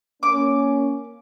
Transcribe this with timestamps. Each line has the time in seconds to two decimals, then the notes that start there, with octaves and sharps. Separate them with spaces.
0.23 A#3 C#4 D6